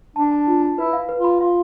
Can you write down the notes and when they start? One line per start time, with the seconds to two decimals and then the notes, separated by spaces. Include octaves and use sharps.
0.16 D4 A5
0.32 A5
0.47 F4
0.63 A5
0.78 E4 B4
0.93 F5
1.09 B4
1.20 F4 B5
1.40 F4 F5